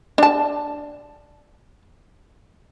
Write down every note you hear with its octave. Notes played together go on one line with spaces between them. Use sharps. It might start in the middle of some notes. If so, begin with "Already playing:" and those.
D4 A5